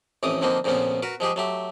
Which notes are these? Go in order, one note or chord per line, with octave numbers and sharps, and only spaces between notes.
A1 F2 E3 D6 D#6
D3 F3 A#3 C4 D#4
F2 A#2 C#3 F3 B3 C#4
F#4 A#4 B4
F3 G#3 G4 G#4
F#3 A3 G4